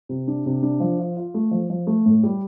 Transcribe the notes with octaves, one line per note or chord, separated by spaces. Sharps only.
C3
D4
C3
D4
F3
F4
F4
A3
F3
F3
A3
A2
G3